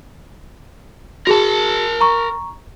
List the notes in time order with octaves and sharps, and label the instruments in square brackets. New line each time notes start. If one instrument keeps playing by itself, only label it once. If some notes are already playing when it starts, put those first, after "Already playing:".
[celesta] F#4 G#4 [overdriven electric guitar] A#4 A5
[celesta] A#5 C#6